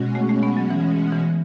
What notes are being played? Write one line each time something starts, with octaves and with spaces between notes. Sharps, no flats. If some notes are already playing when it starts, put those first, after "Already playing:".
Already playing: B2 G#3 C#4 F#4
A3
A3
B3
F#3
E3
E3